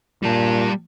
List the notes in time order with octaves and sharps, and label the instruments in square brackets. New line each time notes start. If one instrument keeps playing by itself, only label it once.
[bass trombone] A#2 [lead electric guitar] G3 A5